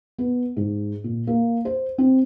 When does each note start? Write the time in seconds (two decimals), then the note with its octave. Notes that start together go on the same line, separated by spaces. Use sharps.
0.18 B3
0.57 G#2
1.04 A#2
1.27 A#3
1.65 C5
1.98 C4